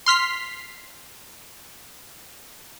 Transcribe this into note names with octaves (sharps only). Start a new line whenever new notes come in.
C6 F6 B6 C7